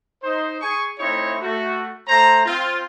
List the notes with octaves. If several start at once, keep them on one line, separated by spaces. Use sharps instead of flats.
D#4 C5
G#4 G#5 C#6
A3 C4 D#4 E4 C#5 C#6
A3 F#4
A3 C5 A#5
C4 F4